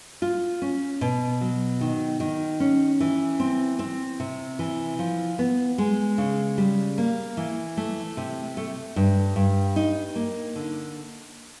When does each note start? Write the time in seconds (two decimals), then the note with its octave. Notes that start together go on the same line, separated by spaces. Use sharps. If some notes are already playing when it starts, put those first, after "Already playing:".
0.22 F4
0.62 C#4
1.01 B2
1.41 F#3
1.81 D#3
2.20 D#3
2.60 C#4
3.00 E3
3.40 C4
3.79 C4
4.20 C3
4.59 E3
4.99 F3
5.39 B3
5.78 G#3
6.18 C#3
6.58 G3
6.98 A#3
7.37 E3
7.77 A3
8.17 C3
8.57 A3
8.96 G2
9.36 G2
9.76 D#4
10.16 A#3
10.56 D3